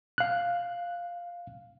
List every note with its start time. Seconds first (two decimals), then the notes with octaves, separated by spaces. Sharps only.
0.18 F5 F#6